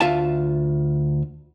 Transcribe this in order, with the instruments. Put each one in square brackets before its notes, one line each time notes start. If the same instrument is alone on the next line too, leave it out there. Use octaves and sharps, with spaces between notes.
[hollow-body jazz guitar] D2 F4 E5 A5